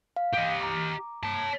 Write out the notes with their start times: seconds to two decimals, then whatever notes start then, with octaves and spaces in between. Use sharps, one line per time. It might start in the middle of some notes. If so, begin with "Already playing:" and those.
0.16 F5
0.33 G4 D#5
0.61 A#5 D6
1.23 C#5 A5